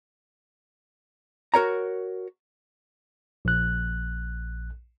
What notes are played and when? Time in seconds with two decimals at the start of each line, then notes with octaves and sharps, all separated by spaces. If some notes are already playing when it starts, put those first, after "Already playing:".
1.54 F#4 A#4 C#5 A#5
3.45 A#1 F#6